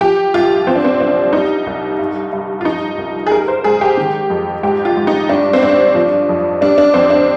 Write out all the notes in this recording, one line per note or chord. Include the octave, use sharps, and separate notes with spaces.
F3 G4
C2 F4
F3 C4
D4
C4
C2 D4
G3 D#4
C2
G2
G2
F4
F3 D#4
C2
G#4
G3 A#4
C5
G#2 G#4
G4
D#3
F2
G#2 G4
F4
G#2
D#4
G2 D4
C4
G2 D4
F3
F2
G3 D4
D4
F2 C4
D4